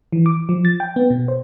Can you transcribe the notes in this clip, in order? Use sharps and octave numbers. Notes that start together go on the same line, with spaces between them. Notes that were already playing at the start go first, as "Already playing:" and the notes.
E3
D6
F3
A6
G5
B3
B2
C5